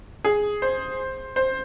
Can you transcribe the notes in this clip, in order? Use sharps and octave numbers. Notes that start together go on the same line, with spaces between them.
G#4
C5
C5